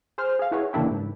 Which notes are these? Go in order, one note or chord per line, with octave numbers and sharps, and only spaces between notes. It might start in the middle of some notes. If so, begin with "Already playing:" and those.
G#4 C5 F6
G#4 F5
E4 F#4 G#4 B4 C#5
C#3 E3 A#3 D4 E4 G4
G#2